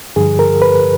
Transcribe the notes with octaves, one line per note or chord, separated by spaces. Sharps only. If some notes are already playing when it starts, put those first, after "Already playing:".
G2 D3 F3 G#4
A#4
B4